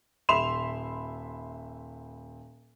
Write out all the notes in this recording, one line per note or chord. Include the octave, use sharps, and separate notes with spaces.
D#1 E5 B5 C6 E7 F7